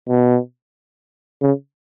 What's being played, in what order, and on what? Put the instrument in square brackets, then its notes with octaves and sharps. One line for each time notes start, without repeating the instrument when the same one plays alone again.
[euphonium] B2
C#3